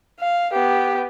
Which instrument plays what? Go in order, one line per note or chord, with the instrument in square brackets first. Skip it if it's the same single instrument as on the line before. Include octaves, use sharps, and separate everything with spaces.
[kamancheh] F5
B3 G4